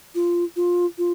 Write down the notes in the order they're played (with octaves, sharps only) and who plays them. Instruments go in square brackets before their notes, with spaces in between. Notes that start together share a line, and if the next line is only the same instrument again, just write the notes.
[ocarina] F4
F4
F4